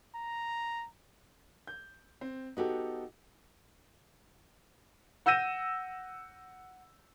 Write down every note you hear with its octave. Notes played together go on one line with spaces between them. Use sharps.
A#5
G6
C4
B3 D#4 F#4 G4 A4
F#5 E6 G6 A#6 D#7 E7